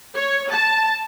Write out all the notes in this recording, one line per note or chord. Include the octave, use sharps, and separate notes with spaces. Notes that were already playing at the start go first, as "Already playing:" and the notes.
C#5
A5